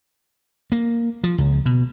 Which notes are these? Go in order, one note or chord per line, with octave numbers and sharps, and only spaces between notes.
A#3
F3
C#2
B2